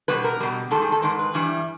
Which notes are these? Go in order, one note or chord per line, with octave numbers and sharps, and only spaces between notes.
B2 G3 B4
A#4
B2 G3
G#2 D#3 G3 A4
G#4
A4
G#2 D#3 A#4
B4
G2 E3 G3